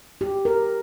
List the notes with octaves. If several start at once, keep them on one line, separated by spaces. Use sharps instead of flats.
G4
A#4